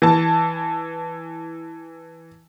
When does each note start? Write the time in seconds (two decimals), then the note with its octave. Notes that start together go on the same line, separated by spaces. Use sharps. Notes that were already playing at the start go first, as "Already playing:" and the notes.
0.02 E3 A5